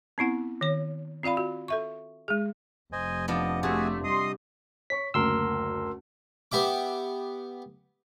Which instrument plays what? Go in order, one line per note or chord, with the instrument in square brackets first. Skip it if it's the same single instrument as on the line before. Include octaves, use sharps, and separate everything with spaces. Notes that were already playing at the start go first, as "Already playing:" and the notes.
[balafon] B3 C4 E4 F#5
D#3 C#5
C4 F4 D5 F5 B5
F#4
A4 E5 C#6
G#3 G#4
[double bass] F1 [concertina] C5 D#5 G#5
[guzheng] F3 B3 D4 [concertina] D#5
[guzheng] C3 [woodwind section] A3 [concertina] F#4 G#4 G#5
[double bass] G3 [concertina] D#5 D#6 [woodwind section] C6
[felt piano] C#5 C#6 [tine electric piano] B6
[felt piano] F#1 D2 [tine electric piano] A#4 C6 E6
[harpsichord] B3 G4 E5 D6